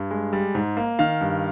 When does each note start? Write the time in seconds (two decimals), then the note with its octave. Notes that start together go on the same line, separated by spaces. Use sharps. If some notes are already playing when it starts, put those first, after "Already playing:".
Already playing: G2
0.11 G#3
0.33 G3
0.55 G#2
0.77 A#3
0.99 D#3 F5
1.21 G2